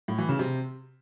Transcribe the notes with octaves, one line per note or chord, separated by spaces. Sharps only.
A2
E3
C#3
C3